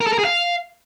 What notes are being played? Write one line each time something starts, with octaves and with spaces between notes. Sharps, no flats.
A#4
A4
A#4
G#4
F5